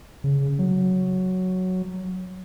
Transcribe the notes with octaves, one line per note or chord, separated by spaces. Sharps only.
C#3
F#3